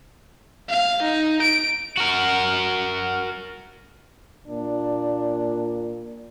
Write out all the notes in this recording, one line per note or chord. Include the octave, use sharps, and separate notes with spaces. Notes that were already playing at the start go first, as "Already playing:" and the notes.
F5
D#4
D7
F#4 A#4
A#2 D4